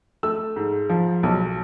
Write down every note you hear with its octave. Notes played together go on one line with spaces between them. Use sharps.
A3 E6
G#2
F3
B1